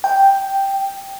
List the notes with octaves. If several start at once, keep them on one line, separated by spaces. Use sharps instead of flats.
G5